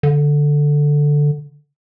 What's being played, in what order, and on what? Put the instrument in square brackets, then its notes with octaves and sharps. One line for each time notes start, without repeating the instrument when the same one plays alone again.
[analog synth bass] D3